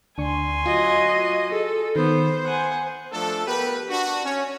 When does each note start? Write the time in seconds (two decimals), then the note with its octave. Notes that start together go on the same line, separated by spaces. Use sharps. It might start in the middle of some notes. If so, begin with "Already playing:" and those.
0.18 D2 D4 G#5 C6 C#6
0.66 F#3 F4 D#5
1.53 G#4 A4
1.96 D#3 B3 C5
2.45 F#5 G#5 C6 G6
3.12 F3 A3 D4 A4
3.47 B3 G4 A#4 B4
3.89 D4 F#4
4.25 C#4 C#5